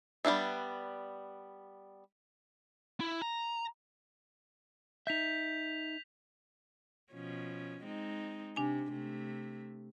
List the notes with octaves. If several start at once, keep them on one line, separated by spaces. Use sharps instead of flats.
G3 B3 D4 E5
E4
A#5
D#4 E5 G6 B6 F7
B2 F3 C#4
G#3 C4 D#4
C3 D4 G#5
C3 A3